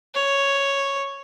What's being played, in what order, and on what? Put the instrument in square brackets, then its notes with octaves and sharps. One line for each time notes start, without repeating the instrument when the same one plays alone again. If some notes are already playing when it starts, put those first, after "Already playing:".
[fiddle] C#5